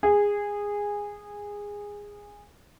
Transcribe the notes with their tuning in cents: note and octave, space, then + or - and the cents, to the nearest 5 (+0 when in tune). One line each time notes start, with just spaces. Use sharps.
G#4 -15